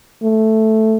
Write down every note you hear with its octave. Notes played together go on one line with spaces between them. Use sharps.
A3